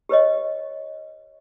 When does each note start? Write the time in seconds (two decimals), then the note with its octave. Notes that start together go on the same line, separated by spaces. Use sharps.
0.09 G4 B4 C#5 D#5